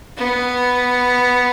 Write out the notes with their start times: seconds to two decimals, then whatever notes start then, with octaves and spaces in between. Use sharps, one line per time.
0.17 B3